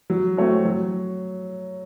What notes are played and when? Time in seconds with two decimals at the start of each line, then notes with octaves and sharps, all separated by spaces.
0.10 F#3
0.37 A3 C4 F#4 C#5
0.65 F#3